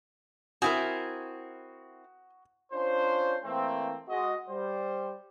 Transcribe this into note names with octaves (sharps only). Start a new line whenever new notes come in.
C4 E4 F#4 A#4 G#5 D#6
C#4 D4 F4 C5
E3 A3 A#3 C4
G#3 F#4 D#5
G3 C5